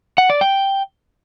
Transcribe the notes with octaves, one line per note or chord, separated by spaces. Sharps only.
F#5
D5
G5